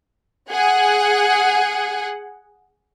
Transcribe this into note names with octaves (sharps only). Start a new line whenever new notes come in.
G#4 F#5